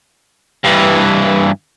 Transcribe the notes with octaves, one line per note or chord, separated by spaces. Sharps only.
G2 E3